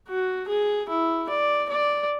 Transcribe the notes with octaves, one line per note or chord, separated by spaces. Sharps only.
F#4
G#4
E4
D5
D5